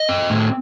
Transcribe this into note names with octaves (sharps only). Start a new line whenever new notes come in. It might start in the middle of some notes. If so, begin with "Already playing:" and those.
Already playing: D#5
C4
A2